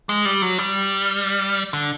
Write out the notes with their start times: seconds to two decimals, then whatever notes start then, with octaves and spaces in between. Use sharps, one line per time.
0.09 G#3
0.25 G3
0.42 F#3
0.58 G3
1.73 D3